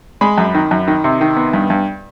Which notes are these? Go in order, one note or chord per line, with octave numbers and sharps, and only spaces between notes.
G#3 B5
F#2
D#3
F#2
D#3
C3
D#3
B3
G2
G2